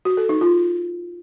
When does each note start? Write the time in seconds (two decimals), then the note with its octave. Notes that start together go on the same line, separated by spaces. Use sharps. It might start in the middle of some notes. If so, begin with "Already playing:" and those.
0.05 F#4
0.17 A4
0.29 D#4
0.41 F4